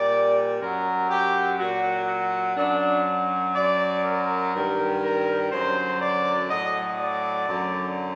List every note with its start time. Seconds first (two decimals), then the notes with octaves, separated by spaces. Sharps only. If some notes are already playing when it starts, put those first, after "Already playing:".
Already playing: A#2 G3 D5
0.61 F#2 F#3 A#4
1.10 G4
1.59 A#2 F#3 F#4
2.07 F#4
2.56 F#2 F#3 D4
3.55 F#2 F#3 D5
4.04 A#4
4.53 G2 D#3 G3
5.02 A#4
5.51 F#2 D3 F#3 C5
6.01 D5
6.50 A2 F#3 D#5
6.99 D5
7.48 F#2 D3 F#3